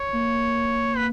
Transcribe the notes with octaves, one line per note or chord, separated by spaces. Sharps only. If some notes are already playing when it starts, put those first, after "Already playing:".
Already playing: C#5
A#3
B4